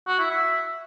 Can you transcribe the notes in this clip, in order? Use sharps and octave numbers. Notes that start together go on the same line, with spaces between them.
F#4
E4
E5